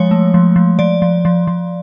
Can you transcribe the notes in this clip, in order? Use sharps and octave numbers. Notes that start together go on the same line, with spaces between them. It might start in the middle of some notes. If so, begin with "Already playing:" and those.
Already playing: F3 G#3 C#5
A3
F3
F3
F3 D5
F3
F3
F3